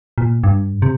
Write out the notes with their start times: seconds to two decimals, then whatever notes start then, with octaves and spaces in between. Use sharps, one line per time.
0.18 A#2
0.44 G2
0.82 C3